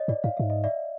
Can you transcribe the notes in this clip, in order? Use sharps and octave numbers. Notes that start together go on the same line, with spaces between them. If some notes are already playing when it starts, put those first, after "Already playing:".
Already playing: C#5 D#5
G#2 D5
G#2 F5
G#2 E5
D#5
D5 E5